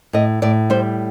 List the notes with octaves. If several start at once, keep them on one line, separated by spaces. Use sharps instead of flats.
A2 D#5
A2 D5
G3 C5